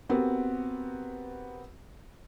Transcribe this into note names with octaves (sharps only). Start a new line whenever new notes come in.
B3 C4 F#4 G4 A#4